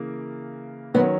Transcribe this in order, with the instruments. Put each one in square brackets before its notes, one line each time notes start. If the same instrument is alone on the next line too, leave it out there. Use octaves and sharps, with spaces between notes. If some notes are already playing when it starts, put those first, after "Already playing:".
Already playing: [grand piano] C#3 E3 A#3
[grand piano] D#3 F#3 C#4 [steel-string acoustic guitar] B3